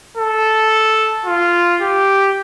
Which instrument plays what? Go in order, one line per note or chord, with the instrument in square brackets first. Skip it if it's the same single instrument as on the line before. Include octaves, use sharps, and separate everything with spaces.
[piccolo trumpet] A4
F4
G4